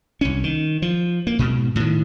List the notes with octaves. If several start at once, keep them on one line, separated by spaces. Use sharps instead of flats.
C2 C#4
D#3
F3
A#3
G#2 B2
A2 D#3